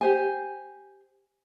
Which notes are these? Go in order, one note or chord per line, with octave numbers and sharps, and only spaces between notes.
G4 C5 G#5